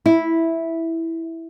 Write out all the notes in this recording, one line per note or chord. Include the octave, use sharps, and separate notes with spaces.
E4